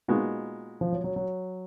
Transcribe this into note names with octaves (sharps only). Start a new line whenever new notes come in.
A#2 G#3 B3 D#4 F#4
F3
F#3
F#3
F#3